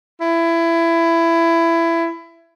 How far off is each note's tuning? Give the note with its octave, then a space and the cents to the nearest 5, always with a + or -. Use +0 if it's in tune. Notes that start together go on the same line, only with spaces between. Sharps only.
E4 +20